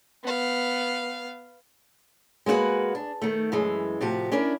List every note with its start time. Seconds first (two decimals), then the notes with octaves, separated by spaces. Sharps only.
0.24 B3 F5
2.46 G#3 A#3 C#4 F#4 B4
2.95 D4
3.22 D#3 A3
3.52 F#2 E3 G#3
4.01 A2 C3 F3 F#4 G4
4.32 C#4 D4 E4 A#4